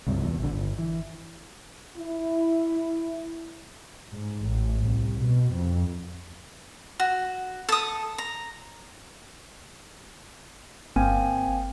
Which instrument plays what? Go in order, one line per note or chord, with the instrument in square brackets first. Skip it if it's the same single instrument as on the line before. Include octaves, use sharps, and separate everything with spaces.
[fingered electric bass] C#2 G2 C3
E2
A#1 D3
G1
E3
[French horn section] E4
[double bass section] G#2
A1
C2
B2
F2
[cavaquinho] F#4
A4 D#6
A#5
[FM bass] G1 [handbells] A#3 C4 G#5